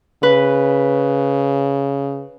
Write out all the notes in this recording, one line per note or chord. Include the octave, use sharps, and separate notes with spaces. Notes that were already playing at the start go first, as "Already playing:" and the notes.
C#3 B4